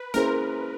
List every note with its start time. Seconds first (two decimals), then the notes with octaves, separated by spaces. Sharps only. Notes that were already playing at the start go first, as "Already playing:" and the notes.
Already playing: B4
0.14 A#3 C#4 E4 G#4 A#4 C5